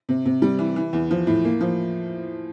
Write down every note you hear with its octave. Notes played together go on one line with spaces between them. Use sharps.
C3
C3
G3
E3
E3
E2
F3
A2
A#3
F3